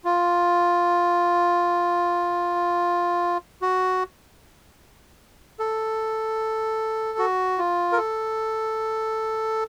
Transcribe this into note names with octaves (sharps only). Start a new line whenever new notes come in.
F4
F#4
A4
F#4
F4
A#4
A4